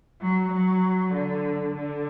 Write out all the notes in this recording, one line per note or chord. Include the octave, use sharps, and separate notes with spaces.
F#3
F#3
D3
D3